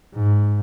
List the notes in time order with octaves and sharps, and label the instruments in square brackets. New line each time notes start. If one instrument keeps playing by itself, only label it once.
[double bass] G#2